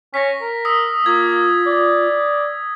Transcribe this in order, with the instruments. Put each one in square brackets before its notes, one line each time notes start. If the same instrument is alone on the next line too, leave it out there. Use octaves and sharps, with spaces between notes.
[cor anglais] C#4 [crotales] A#6 B6
[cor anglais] A#4
[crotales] D#6 E6 B6
[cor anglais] A#3 [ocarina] F4 [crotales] G#6
[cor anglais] D5